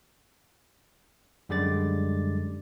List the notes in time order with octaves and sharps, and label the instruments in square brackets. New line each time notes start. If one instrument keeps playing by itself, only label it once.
[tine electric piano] F#2 D3 G3 G#3 D5 A6